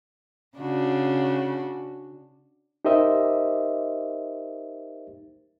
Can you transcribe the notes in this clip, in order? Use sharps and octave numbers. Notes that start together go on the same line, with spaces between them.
C#3 D4 F#4
D#4 G4 A#4 C5 D#5 E5